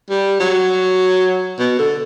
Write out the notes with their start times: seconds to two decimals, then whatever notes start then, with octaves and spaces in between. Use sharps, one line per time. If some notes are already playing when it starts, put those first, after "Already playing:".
0.10 G3
0.40 F#3
1.59 B2
1.79 D3